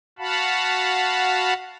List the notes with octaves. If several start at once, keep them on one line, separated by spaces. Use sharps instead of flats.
F#4 F5 F#5 A5 B5